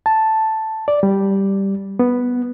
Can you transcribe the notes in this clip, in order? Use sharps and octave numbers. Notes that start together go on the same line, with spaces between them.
A5
D5
G3
B3